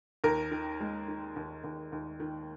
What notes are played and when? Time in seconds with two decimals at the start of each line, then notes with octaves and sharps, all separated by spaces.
0.24 D#2 A#4
0.51 D#3
0.80 G#3
1.08 D#3
1.36 D#2
1.64 D#2
1.92 D#2
2.20 D#3